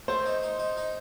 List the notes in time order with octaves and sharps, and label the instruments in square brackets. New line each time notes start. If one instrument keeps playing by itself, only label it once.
[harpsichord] A3 [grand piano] C5
[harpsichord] D#4
D#4
D#4
D#4